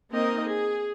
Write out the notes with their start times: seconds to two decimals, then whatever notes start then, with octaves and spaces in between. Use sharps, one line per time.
0.12 A#3 C4 D#4 A#4 D#5
0.48 G#4